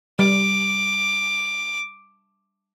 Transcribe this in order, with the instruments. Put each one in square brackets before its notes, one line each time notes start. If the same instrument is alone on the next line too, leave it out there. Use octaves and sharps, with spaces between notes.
[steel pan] G3 [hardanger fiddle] D6